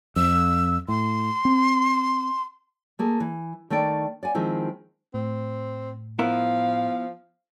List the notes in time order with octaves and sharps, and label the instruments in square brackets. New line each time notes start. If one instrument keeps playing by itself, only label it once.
[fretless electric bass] F2 [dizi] E6
[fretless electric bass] A2 [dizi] C6
[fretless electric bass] C4
[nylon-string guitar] A3 A#3 G#4
E3
D#3 A3 D5 G5
D5 F#5 G#5
D#3 F3 G#3 C4 E4
[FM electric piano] A2 [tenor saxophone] C4
[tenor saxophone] F3 [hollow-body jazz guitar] B3 E4 A#4 [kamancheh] F5